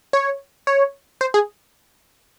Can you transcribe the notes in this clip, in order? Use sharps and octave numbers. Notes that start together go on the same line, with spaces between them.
C#5
C#5
C5
G#4